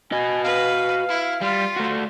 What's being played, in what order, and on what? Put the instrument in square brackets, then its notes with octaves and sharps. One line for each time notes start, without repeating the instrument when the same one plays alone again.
[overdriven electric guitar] F#4 D#5 [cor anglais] G#5
[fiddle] B4 [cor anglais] F5
[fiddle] E4
[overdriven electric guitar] G3 [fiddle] F4
[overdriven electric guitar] A3 F#4